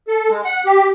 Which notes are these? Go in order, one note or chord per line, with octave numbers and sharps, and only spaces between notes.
A4
G#3
F#5
G4